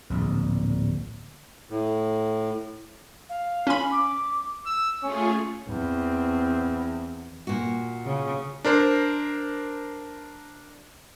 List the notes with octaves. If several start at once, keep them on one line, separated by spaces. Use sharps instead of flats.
D1 A#1
A2
F5
C#4 B5
D6
E6
A3 C#4 F4 G#4 C#6
E2 C4
A#2 F#4
C#3
D4 A#4 C5